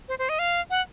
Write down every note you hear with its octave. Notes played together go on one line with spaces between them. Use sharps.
C5
C5
D#5
F5
F#5